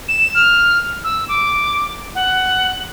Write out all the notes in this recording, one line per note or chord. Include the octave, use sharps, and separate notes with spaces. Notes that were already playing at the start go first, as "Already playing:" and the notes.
E7
F6
E6
D6
F#5